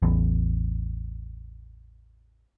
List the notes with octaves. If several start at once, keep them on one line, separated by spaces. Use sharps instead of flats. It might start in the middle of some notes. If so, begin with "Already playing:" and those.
A1 E2